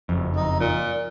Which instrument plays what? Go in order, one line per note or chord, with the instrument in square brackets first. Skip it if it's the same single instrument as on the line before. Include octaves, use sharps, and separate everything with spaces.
[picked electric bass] F#1 F2
[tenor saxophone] D#4
A#2